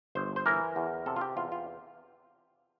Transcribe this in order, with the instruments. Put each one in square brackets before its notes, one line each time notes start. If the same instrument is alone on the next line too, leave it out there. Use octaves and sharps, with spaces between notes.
[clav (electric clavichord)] G1 C5
C5
E3 A#4
E2
C3 A4
F4
G4
E2 F4
F4